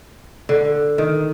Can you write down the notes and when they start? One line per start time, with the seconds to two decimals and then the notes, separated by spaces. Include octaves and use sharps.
0.49 D3
0.98 D#3